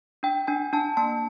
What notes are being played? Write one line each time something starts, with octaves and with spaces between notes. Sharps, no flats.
D4 G5
D4 G#5
D4 A5
A#3 A5